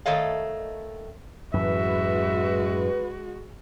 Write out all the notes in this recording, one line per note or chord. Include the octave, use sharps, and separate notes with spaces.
D#3 A3 C#5 D#5 F5
F#2 A2 E3 G#3 F#4 B4 E5